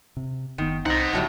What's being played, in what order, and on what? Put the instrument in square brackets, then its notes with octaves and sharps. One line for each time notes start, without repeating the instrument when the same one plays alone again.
[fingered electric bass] C3
[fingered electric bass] F#1 A2 B3 [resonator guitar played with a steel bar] D#3
[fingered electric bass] C2 [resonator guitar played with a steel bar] C4 [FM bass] D#4 [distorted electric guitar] D#5 F#5
[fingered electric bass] A1 D3 [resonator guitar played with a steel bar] A2 F#3 G3